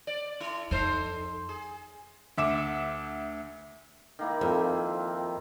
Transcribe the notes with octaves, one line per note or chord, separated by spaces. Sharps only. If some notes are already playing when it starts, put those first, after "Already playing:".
D5
E4 A4
F2 D#4 A4 C5
G#4
D2 E5 D6 E7
D#3 A#3 E4
F2 C4